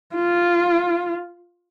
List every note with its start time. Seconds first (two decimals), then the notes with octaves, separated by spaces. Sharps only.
0.15 F4